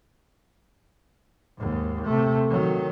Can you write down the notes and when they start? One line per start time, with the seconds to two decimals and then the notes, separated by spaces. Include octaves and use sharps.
1.57 D#2 G#2
2.04 C3 A3
2.50 D#3 F#3